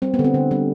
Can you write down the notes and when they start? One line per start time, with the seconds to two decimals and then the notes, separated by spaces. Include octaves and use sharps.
0.02 G3 C4
0.14 B3
0.19 D3
0.24 C4
0.34 D3
0.51 G3